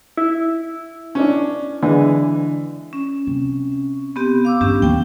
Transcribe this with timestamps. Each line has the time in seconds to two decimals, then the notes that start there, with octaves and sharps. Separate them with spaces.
0.17 E4
1.15 C#4 D4
1.82 D3 E3 G#3
2.93 C#4
3.27 C3
4.16 B3 C4 G4
4.45 F5 D6 E6
4.61 A#1 G2 B3 C#4 G4
4.82 D#2 A#3 G5